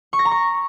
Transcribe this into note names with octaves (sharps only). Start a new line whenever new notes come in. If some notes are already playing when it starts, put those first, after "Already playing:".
C#6
A#6
A#5
C#6